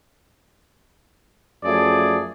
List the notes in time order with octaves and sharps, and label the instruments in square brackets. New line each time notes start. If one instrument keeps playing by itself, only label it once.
[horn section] F#2 F3 A3 G#4 D5